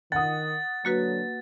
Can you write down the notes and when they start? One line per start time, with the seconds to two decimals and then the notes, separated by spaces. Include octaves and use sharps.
0.12 D#3 F#5 D#6 A6
0.85 D3 F#3 A#3 F#4 B4